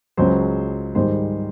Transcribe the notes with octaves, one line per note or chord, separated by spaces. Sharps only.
C#2 C#3 F#3 C5
G#2 D#3 G3 C5